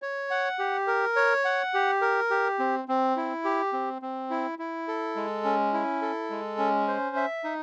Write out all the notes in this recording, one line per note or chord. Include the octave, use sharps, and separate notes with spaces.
C#5
F#5
G4
A#4
C#5
F#5
G4
A#4
G4
C4
C4
E4
G4
C4
C4
E4
E4
A4
G#3
C#4
E4
A4
G#3
C#4
C5
E5
D#4